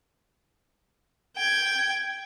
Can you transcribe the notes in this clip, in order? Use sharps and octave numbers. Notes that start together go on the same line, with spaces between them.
G5 G#6